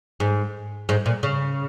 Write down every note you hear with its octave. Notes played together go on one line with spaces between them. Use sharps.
G#2
G#2
A#2
C#3